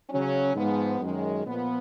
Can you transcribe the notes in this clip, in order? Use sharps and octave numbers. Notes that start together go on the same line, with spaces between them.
C#3 F#3 C#4
G#2 F3 G#3 B3
F#2 D#3 G#3
A#2 F3 B3